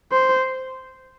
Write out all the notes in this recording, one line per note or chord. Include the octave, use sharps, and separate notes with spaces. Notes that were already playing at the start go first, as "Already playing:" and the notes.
C5